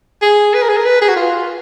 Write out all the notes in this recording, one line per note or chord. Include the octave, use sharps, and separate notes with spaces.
G#4
B4
A#4
G#4
A#4
B4
G#4
F#4
F4